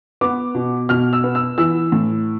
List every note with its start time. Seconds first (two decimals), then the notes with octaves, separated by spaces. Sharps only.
0.21 B3 D6
0.55 B2
0.89 B2 F6
1.13 E6
1.24 B3
1.35 E6
1.58 E3 E6
1.92 A2